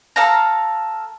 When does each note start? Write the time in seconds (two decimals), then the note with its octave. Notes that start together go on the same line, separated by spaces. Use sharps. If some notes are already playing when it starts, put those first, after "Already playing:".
0.16 A4 F5 A#5